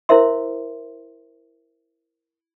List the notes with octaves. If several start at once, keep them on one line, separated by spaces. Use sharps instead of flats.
E4 A#4 C5 E5 C6